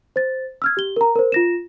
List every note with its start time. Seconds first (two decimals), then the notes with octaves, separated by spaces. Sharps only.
0.16 C5 A6
0.62 E6 F6 G#6
0.77 G4 G7
0.96 A#4 A#5
1.16 A#4 C5
1.32 F4 A#6 E7